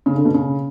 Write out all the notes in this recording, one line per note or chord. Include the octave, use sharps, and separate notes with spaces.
C#3
D3
B2
C#3